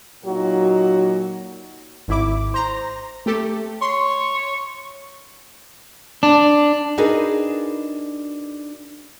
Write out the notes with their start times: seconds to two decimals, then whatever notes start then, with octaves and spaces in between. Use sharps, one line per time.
0.25 A#2 F#3 A#3 D#4 F#4
2.08 G#1 E4 D6
2.54 C5 A#5
3.26 A3 G4 A4
3.81 C#5 C6
6.23 D4
6.98 D4 D#4 F#4 G#4 A#4 B4